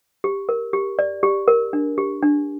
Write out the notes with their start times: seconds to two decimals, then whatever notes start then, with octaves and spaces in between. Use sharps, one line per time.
0.24 G4
0.49 A#4
0.73 G4
0.99 D5
1.23 G4
1.48 A#4
1.73 D4
1.98 G4
2.22 D4